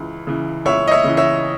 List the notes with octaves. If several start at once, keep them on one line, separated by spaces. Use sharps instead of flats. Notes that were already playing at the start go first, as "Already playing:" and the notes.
Already playing: C#2 C#3 E3
C#3 E3
C#2 C#5 E5
D#5
C#5 E5
C#3 E3
C#5 E5